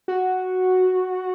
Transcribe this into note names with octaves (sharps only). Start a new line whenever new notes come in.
F#4